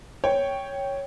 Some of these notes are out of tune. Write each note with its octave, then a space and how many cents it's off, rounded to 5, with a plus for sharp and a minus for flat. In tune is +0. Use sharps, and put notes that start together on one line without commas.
C#5 +0 G5 +0